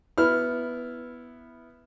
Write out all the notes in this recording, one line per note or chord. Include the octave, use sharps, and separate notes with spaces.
B3 E4 F6